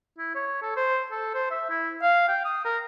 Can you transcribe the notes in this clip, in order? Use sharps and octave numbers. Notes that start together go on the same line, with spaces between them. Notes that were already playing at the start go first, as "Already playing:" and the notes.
E4
C#5
A4
C5
A4
C5
E5
E4
F5
G5
D#6
A#4